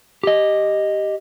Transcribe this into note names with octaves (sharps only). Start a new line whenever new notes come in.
G4 D#5